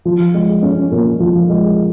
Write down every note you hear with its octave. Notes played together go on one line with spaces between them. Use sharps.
F3
G#3
C#4
A#2
F3
G#3